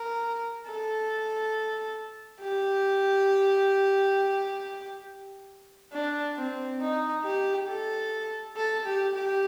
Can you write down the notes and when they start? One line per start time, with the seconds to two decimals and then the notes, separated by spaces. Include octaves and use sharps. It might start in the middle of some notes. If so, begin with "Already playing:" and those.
Already playing: A#4
0.67 A4
2.42 G4
5.93 D4
6.36 C4
6.81 D#4
7.24 G4
7.68 A4
8.56 A4
8.85 G4
9.15 G4